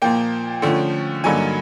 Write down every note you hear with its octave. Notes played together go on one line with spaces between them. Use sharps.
A#2 F3 A#3 G5
D3 F3 A3 C#4
G2 D3 F#3 A#3 D#4 G#5